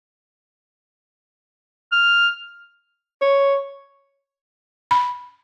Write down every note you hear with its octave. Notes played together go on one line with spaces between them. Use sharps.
F6
C#5
B5